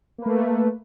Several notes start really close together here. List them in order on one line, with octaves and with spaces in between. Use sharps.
A#3 B4 A3